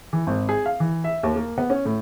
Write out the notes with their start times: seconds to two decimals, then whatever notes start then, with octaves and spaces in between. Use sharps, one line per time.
0.13 E3
0.27 G#1
0.49 G#4
0.66 F5
0.80 E3
1.04 E5
1.23 D#2
1.36 A#3
1.58 B3
1.70 C#4
1.85 A2